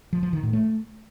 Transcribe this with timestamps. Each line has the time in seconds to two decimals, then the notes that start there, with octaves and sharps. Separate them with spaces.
0.13 F3
0.23 F3
0.33 D#3
0.43 A2
0.53 A3